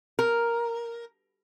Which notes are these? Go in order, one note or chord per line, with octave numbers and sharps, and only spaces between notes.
A#4